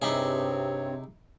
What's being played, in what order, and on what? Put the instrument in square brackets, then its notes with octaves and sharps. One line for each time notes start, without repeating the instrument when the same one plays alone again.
[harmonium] G2 C4 [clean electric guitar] C3 [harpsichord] D#4 E4 G#4 [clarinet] C#5